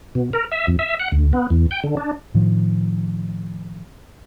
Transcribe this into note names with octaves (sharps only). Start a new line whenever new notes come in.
B2
A#4
E5
F2
E5
F#5
D2
B3
E2
G5
D3
D4
A2 D#3 F3